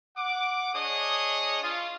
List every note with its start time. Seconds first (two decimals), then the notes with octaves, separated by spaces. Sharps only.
0.16 F#5 D6
0.74 D4 G#4 C#5 D#5 D#6
1.62 F4